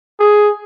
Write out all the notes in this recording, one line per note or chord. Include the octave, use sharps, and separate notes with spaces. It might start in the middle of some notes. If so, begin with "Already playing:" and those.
G#4